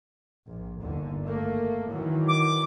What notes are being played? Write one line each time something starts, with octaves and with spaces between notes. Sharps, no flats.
A#1
G1 D#2 D3
A3 A#3
D#3 E3 F#3
D6